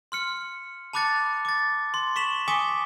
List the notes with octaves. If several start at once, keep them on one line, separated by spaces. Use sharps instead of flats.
C6 F6 C#7
A5 B5 D6 F#6 A6 C#7
D6 A6
C6
C#6 B6 E7 F#7
G#5 D6 D#6 B6 C#7 G7